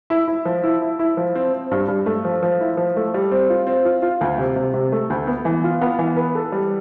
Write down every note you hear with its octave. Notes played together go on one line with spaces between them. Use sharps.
E4
E4
F3
E4
E4
E4
F3
C4
C4
G2
G2
A3
F3
F3
E4
F3
A3
G3
C4
F4
C4
F4
F4
D2
C3
C3
C3
A3
D2
B3
E3
F4
B3
E3
B4
A4
G3